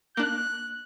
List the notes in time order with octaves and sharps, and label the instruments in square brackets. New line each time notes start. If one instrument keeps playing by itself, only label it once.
[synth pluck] A#3 D4 [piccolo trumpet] F#6